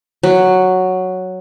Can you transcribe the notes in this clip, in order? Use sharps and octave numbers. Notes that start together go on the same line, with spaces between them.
F#3